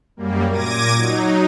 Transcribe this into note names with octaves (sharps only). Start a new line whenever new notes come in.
F#2 G3 A#3
A#2 D6 G#6 A#6 D#7
F#3 D#4